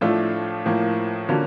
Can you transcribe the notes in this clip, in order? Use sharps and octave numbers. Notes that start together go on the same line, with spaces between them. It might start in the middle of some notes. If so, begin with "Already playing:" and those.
A2 F3 A3 D4 F4
A2 F3 A#3
D3 F3 A#3 C#4 F#4